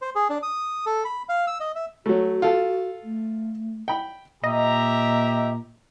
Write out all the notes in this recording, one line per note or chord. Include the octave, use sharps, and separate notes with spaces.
C5
G#4
D4
D#6
A4
B5
F5
E6
D#5
E5
F#3 A3 F#4
F4 A4
A3
G5 B5
A#2 G4 D#5 E5 A#5